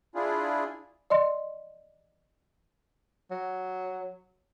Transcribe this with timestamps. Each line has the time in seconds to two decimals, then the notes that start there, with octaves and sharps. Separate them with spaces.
0.15 D4 E4 F4 G#4
1.10 D5 D#5 C6
3.31 F#3